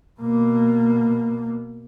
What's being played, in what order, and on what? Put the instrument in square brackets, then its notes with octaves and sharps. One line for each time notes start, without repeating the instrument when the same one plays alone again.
[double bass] B2 A#3